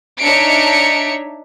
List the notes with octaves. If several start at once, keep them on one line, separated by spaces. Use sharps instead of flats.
D4 D#4 C#5 E5 C#7 D7